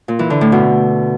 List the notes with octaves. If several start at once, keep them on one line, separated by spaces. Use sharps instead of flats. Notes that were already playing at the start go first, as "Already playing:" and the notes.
A#2
E3
D3
A2
B2